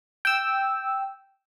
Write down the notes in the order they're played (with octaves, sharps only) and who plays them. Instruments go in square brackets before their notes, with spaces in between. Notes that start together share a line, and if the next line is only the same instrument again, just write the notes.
[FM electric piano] G5 E6